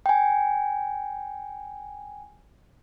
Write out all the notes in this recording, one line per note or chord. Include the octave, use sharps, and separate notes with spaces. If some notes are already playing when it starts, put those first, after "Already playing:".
G5 G#5